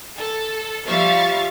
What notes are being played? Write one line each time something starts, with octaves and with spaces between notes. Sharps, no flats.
A4
F3 G3 E5 F5 C#6 A6